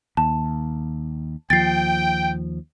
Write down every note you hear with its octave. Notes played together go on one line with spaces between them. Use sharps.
D#2 A5
D#2 F3 G5 A6 C7